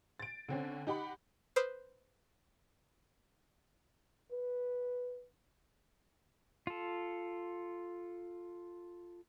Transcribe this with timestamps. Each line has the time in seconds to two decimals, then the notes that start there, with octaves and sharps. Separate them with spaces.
0.20 A6 D7
0.49 D3 C4 C#4
0.87 D#4 G4 F#5 B5
1.56 B4 C5 D6 D#6 F6
4.32 B4
6.67 F4 A4